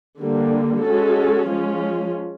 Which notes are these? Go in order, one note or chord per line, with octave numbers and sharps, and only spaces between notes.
D3 G3 A#3
G#3 C#4 F#4 A4
F3 G#3 C#4 F4